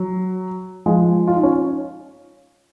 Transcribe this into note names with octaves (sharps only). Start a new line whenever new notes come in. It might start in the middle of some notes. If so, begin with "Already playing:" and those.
Already playing: F#3
F3 G#3
F4
D#4
C#4